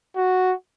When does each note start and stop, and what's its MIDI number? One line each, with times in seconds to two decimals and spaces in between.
0.17 0.53 66